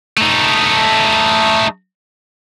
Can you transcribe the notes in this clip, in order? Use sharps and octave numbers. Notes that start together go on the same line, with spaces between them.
A3 D#4